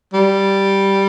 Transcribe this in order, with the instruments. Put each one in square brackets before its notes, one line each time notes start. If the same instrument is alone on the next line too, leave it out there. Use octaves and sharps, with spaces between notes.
[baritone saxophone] G3